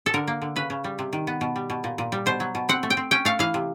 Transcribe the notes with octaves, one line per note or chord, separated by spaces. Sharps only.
A4
D3 A#4
A#3
D3
C#3 B4
C#3
G3
C3
D#3
B3
B2
G3
B2
A#2
A#2
G3
B2 C5
F#3
B2
C4 F#5
A3
G5
C4
C#4 G5
A3 F5
E3 F5
C3